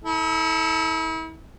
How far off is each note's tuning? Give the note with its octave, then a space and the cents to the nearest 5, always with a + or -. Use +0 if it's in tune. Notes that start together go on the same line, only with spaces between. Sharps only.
E4 -40 A4 +0